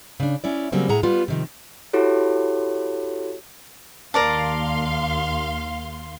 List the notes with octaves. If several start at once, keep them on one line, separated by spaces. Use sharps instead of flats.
C#3 D4
C#4 E4 D5
C#3 F#3 G3 A#3 C4
A2 G#4 F#5 A#5
G3 B3 F4
C3 D#3 F3
E4 F#4 G4 A4 C#5
D#2 A#4 D5 F5 A5 C6